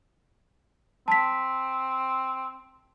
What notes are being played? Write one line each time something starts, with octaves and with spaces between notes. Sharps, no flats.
C4 A5 B6